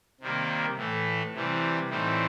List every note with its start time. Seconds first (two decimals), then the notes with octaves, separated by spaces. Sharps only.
0.21 C3 D#3 G3 A#3
0.77 A2 E3 A3
1.34 C3 E3 G3
1.90 A2 E3 G3 C4 D#4